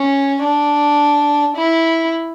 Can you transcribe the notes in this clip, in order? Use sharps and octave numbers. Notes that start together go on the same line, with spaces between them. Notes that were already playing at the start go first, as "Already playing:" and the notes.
Already playing: C#4
D4
E4